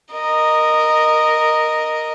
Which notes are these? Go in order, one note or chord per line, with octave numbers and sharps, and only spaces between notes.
A#4 D#5